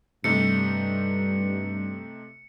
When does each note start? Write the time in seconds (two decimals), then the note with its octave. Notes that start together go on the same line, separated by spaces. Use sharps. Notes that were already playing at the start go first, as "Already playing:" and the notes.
0.24 G2 C3 A3 D#4 C#7